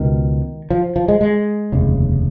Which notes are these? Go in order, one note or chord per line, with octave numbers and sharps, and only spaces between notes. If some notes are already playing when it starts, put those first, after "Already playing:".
Already playing: C#2 B2 D#3
F3
F3
G#3
G#3
F1 D#2 C#3